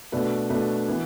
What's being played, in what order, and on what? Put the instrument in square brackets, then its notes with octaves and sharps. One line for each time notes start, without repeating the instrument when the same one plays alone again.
[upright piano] B2 A3 D4 F#4 B4
B2 A3 D4 F#4 B4
E3 B3